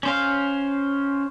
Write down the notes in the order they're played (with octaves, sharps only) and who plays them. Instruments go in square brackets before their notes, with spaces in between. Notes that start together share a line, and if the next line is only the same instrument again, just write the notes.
[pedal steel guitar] C#4 C5 F5